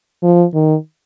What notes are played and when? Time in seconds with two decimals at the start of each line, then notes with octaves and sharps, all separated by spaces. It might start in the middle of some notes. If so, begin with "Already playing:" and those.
0.23 F3
0.54 D#3